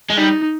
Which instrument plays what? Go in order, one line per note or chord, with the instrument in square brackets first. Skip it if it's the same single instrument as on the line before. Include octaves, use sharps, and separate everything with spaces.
[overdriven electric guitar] G#3
[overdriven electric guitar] G3 [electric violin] D#4